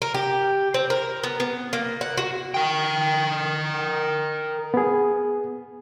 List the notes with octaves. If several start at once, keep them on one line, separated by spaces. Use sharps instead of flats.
A#4
G4
C4
A#4
B3
B3
A#3
F#5
F#4
A#4 G5
B3 G#4